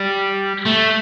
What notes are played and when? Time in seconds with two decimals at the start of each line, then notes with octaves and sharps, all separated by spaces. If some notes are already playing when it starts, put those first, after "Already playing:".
Already playing: G3
0.65 A3